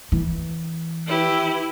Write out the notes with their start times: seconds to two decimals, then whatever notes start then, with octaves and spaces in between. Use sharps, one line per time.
0.12 E3
1.06 E4 G4 B4